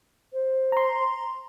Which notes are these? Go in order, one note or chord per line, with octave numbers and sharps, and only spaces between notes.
C5
A#5 C6